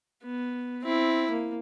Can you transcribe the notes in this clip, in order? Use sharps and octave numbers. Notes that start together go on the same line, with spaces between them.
B3
C4 E4
A#3